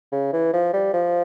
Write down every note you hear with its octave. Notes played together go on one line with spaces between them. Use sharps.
C#3
E3
F3
G3
F3